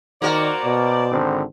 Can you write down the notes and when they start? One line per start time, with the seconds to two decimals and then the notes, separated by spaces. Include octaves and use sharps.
0.22 D#3 A#3 F#4 A#4 C5 D5
0.65 B2
1.11 G#1 D3 C4